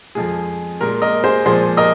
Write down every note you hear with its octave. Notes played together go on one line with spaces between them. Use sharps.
F2 F3 G#3 G#4
A#2 G#3 A#4
A#4 D#5
G#4 C5
A#2 F3 G#3 G#4 C5
A#4 D#5